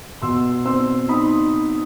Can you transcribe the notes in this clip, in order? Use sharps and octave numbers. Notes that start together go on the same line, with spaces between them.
B2 C6 E6
C4 C6 E6
D#4 B5 D#6